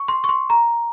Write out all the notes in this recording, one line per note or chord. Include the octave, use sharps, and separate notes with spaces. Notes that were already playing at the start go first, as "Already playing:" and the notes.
Already playing: C#6
C6
C#6
C6
A#5